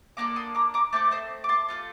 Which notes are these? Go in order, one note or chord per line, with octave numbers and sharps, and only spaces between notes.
A#3 D4 A4 A#5 D6
C6 D#6
A#5 D6
A#5 D6
A3 C4 A4 D6
C5 D#5
D6
A5 C6
A3 C4 F4 A4